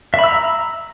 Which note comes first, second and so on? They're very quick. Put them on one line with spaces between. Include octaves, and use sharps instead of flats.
E5 B5 E6 A#5